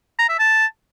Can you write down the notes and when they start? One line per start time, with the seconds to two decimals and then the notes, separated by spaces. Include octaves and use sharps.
0.19 A#5
0.29 E5
0.39 A5